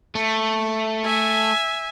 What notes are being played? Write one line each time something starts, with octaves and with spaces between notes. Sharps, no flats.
A3
E5 G#5